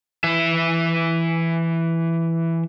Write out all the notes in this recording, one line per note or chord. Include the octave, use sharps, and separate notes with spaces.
E3 E5